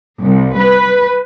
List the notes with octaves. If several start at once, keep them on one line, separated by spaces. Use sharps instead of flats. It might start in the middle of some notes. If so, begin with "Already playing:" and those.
C2
B4